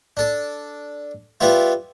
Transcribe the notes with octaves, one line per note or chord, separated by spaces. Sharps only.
D4 A4
G3 B3 E4 F4